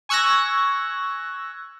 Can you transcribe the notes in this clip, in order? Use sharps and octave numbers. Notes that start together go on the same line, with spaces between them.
G#5 C#6 E6 F#6 G#6 A#6